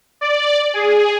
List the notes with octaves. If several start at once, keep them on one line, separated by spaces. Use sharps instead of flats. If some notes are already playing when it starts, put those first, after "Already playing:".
D5
G#4